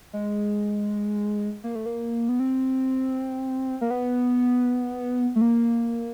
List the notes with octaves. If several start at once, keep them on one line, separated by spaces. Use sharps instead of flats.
G#3
A#3
A3
A#3
B3
C4
A#3
B3
A3
A#3